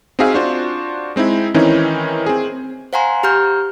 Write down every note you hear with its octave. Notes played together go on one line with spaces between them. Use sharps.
C4 D#4 F#4 G#4 E5 F5
D4 F4 F#4 C5
G#3 C4 D#4 E4
D#3 E3 C4 C#4 D#4 E4
C4 G#4
C5 F5 F#5 G#5 A#5 C6
G4 A#5 F6 G6